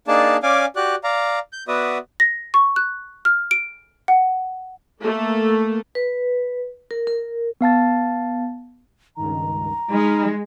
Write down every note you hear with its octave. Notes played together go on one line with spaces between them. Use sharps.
A#3 D4 D#4 G#4 D5 A5
C#4 D5 F5 G#5 D6
F#4 G4 D5 F#6
D5 F5 A#5
G6
B3 F#4 B4 D5 E5 D#6
A#6
C#6
F#6
F6
D7
F#5
A3 A#3
B4
A#4
A#4
B3 F5 A5 A6
C#2 G2 D#3 A#5
G#3 D#4 B5 D#6 F6